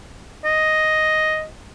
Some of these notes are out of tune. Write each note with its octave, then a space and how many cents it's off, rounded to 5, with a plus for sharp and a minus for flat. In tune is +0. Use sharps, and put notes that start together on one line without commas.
D#5 +0